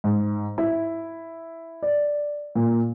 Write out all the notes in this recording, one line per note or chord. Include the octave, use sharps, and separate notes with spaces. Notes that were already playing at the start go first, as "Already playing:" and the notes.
G#2
E4
D5
A#2